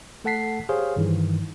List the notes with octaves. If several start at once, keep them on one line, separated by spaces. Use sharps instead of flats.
A3 A4 F#5 A5 B6 C7
G4 G#4 C5 C#5 F5
G2 D#3 E3